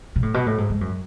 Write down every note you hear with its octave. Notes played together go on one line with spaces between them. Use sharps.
B2
A2
B2
A2
G#2
G#2
F#2